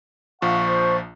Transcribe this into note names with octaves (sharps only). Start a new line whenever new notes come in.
A#1 F3 F5 F#5 C#6
C5